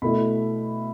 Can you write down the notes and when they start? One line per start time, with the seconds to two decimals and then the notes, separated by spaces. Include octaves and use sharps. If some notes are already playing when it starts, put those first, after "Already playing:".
0.02 B2 A3 E4 B5